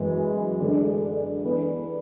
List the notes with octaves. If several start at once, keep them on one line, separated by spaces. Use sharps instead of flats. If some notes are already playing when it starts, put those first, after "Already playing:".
Already playing: F#2 E3 G#3
D3 G#3 D4 A4 D5
E3 B3 D4